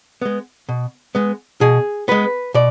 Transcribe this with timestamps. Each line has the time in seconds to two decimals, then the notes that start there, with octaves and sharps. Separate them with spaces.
0.22 G#3 B3
0.69 B2
1.15 G#3 B3
1.61 B2 G#4
2.08 G#3 B3 B4
2.54 B2 D5